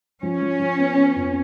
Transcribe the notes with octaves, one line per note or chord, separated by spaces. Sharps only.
F3 C#4
F3
F3
B3
B3
F2